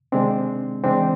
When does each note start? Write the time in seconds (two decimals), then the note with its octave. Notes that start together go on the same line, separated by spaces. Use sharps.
0.12 C3 D#3 G#3 C4 D4
0.83 C#3 E3 G#3 C4 D4